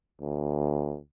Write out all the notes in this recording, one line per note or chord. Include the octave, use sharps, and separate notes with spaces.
D2